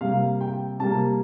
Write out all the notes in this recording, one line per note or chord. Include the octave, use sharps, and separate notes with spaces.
C3 G3 A#3 F5
G5
C3 G3 A#3 A5